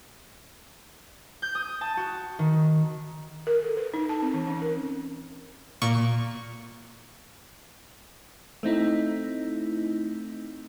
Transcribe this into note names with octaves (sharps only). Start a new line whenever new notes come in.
G6
D#6
A5
F#4
D#3
A#4
A4
B4
D#4
A5
C4
E3
C#4
A#4
A#2 C#6
A3 C4 D#4 E4